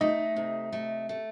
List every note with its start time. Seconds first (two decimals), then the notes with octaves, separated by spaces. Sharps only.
0.01 A3 D#4 D#5
0.36 C3
0.72 A3
1.09 A3